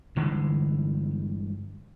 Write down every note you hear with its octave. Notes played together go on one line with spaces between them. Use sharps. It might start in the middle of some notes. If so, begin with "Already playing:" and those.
G1 D3 E3 G#3